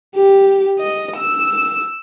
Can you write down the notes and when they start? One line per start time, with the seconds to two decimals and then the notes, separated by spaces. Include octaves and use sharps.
0.16 G4
0.79 D#5
1.17 E6